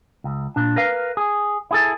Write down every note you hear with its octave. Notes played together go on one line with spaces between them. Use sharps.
C#2
A#2 D4
A#4 B4 F5
G#4
E4 G#4 A4